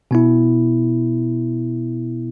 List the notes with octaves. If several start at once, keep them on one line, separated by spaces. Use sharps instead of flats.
B2 B3 E4